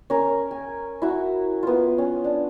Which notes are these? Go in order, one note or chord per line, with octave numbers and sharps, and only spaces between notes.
C#4 A#4
G#5
E4 F#4
B3 F4
C#4
D4